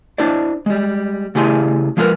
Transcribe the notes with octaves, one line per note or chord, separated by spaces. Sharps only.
D4 E4 C5 D5
G3 G#3
C#3 A3 E4 G4 G#4 C6
F3 G#3 F4 G4 A#4 B4